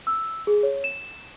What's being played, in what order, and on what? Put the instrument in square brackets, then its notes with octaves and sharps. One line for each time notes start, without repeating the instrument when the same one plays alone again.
[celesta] E6
G#4
C#5
E7